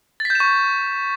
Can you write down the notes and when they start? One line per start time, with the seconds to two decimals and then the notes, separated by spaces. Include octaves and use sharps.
0.20 A6
0.25 B6
0.30 G6
0.35 E7
0.40 C#6